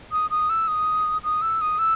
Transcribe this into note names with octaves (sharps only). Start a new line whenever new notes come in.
D#6
D#6
E6
D#6
D#6
E6
D#6
E6